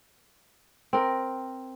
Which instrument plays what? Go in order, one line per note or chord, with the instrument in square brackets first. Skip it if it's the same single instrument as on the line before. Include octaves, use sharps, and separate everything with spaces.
[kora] C4 A#4